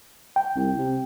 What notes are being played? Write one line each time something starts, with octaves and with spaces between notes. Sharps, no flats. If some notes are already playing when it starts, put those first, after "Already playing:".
G5
C2
C3